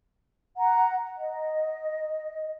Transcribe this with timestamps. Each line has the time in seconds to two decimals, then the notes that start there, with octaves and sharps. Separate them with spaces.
0.57 F#5 A#5
1.18 D#5